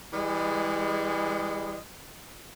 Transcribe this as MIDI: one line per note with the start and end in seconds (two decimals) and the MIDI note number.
0.13 1.77 52
0.13 1.77 55
0.13 1.77 56